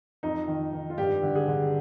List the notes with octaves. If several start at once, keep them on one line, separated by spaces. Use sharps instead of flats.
F2 D#4
D#3
D#3
F4
G2 G4
D3
G#4
D3